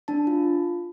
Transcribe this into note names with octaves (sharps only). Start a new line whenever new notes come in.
D4 A5
F4